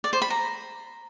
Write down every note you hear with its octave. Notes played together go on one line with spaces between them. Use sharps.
D5
C5
B5
A#5